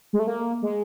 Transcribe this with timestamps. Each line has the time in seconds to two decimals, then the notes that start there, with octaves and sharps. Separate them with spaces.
0.13 G#3
0.19 A3
0.27 A#3
0.62 G#3